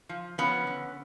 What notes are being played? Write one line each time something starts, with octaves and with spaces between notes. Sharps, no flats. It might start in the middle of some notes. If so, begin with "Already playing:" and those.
F3
F3 B3 C#4
D3